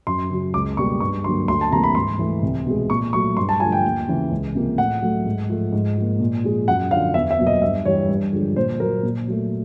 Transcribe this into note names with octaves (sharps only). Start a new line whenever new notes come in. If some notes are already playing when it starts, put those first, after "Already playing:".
F#2 C6
C#3 F#3
C#2 D6
B2 G3 A#3 C#6
G2 C#6
D3 F#3 A#3 C6
D2 C6
A5
C3 E3 G3 A#3 A#5
B5
G#2 C6
E3 A3
C2
B2 G#3
A#2 C#6
F#3 A3 C#6
G2 C6
A5
D3 F3 A3 G#5
G5
D#2
C#3 E3
C#2
C3 F3 A#3
A2 F#5
F#3 A3
G#2
F3 A3
G#2
F3 A#3
A#2
F3 G#3
F#2 F#5
D3 F3 F5
E2 E5
E5
B2 F#3 A#3
D#5
G2 E5
E3 G3 C#5
G2
D3 F3 G#3
A#2 C5
F#3 A#3 A#4
A#2
F#3 A3